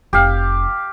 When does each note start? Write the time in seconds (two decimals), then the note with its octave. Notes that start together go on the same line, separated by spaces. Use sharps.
0.13 F1 G4 F5